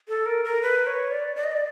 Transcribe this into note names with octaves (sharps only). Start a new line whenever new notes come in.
A4
A#4
A#4
B4
C#5
D5
D5
D#5
D5